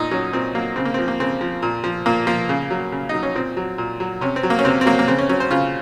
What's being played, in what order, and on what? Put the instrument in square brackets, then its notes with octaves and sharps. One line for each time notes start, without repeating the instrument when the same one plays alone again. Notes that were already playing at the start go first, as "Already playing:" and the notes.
Already playing: [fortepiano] A#2 D#4
F#3 C#4
A#2 C4
F#3 A#3
C#3 C4
A#3
F3 C4
A#3
C#3 C4
F3
A#2
F3
A#2 A#3
F3 A#3
C#3
F#3
C#3
F#3 D#4
C#4
A#2 C4
F#3
A#2
F#3
C3 C#4
C4
F#3
A#3
C#4
C3 C4
C4
F#3 A#3
A#3
C#3 C4
C#4
F#3 C#4
C5
C#3 F4